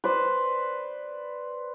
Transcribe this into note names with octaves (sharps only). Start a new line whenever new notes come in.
B4 C5 D5